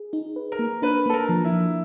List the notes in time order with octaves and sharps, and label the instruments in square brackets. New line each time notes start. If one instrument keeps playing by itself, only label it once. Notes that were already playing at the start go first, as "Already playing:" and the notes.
Already playing: [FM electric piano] G#4
D#4
B4
[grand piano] A#4
[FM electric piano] A#3
[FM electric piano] D4 [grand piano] B4
[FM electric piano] A#3 [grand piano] A4
[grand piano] A#4
[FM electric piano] F3
[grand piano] E4
[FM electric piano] F3